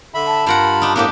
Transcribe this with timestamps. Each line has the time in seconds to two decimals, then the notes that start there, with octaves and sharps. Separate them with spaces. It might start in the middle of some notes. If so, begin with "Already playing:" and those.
0.14 D3 E5 B5
0.27 A5
0.46 G2 F4 A#4 F#5 B5
0.82 D4 D#4
0.96 A2 A#3 B3 D4 G4